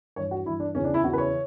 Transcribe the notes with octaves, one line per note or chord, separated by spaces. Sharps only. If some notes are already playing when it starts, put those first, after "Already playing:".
G2 E3 C#5
F#4
G2 E3 E4
D4
E2 C#3 E3 C#4
D4
E4
E2 C#3 E3 F#4
B4
C#5